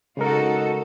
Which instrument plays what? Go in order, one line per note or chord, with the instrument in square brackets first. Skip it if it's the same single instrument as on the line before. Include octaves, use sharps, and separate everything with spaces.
[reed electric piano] C#3 G#3 A#4 [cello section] D#4 F#4 A4